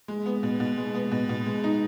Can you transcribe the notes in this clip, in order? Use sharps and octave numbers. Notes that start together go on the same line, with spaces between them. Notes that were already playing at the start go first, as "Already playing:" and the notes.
G#3
B3
B2
B2
G#3
B3
B2
B2
G#3
D#4